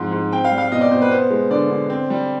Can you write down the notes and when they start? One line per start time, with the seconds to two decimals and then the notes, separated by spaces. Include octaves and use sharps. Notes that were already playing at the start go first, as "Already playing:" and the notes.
Already playing: G#2 F3 C4
0.12 G#2
0.32 C4 G5
0.45 F5
0.52 G3
0.58 F5
0.72 B2 D#5
0.81 D5
0.91 B2 C5
1.02 B4
1.10 B3 C5
1.30 G#3
1.50 D3 D5
1.70 D3
1.90 C4
2.10 G3